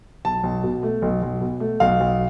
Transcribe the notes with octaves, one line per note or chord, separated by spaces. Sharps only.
B1 A5
B1
B2
A3
B1
B1
B2
A3
B1 F5
B1